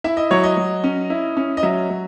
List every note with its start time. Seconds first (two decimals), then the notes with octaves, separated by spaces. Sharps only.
0.04 E4 E5
0.17 D#5
0.31 F#3 C#5
0.43 D#5
0.57 F#3
0.84 C#4
1.10 E4
1.37 C#4
1.57 D#5
1.63 F#3 E5
1.90 F#3